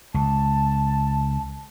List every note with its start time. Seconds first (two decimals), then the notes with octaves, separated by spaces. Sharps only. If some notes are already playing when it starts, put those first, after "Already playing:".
0.14 C#2 A5